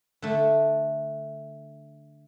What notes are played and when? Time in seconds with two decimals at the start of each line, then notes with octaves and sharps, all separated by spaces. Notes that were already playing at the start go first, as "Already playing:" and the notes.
0.22 D3 A3